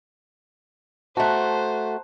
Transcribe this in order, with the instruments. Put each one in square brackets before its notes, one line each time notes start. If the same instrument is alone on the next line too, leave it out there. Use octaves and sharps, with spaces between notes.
[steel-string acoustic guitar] A3 F#4 [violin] C5 [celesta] A5 A#5 F#6